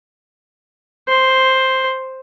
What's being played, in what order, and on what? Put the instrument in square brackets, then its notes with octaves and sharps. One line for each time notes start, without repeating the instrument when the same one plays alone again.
[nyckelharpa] C5